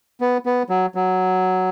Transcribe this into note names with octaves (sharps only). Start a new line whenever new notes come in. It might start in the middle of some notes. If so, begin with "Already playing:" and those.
B3
B3
F#3
F#3